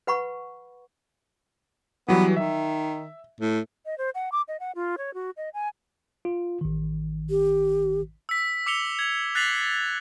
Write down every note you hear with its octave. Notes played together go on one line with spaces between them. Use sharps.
B4 F#5 B5 C#6
E3 F#3 G3 B3
D#3 E5
A2
D#5
C5
F#5
D6
D#5
F#5
F4
C#5
F#4
D#5
G#5
F4
A1 D#3
G4
E6 B6
D6 E6 C#7 F7 G7
G#6
F#6 A6 B6 C7 F7 F#7